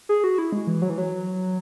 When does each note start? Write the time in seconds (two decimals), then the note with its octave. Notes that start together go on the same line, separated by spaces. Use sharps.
0.09 G#4
0.24 F#4
0.38 E4
0.52 G#3
0.67 E3
0.82 F#3
0.90 E3
0.98 F#3